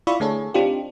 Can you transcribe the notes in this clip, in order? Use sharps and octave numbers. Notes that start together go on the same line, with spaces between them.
E4 F4 D5 E5 B5 C#6
D3 A3 G#4 A4 C#5
C4 D4 D#4 F4 G4